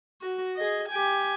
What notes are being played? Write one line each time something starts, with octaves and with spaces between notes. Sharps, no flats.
F#4
G#4 D#5
G4 G#5